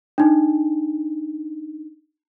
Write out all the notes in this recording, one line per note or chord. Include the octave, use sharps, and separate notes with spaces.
D4 D#4